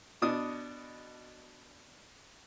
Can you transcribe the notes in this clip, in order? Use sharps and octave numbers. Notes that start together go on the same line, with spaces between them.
B2 D4 D#6